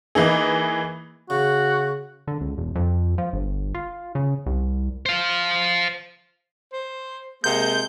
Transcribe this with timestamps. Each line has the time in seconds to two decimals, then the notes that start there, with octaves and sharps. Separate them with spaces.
0.15 E3 A#3 D#4 G#4
1.30 C#3 F#4
2.27 D3
2.41 C#2
2.58 E1
2.75 F2
3.18 F3
3.33 G1
3.74 F4
4.15 C#3
4.46 C2
5.06 C5 F5
6.73 C5
7.44 C3 G#3 A#3 G6